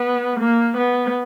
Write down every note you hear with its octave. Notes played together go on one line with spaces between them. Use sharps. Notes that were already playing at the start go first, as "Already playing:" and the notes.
Already playing: B3
A#3
B3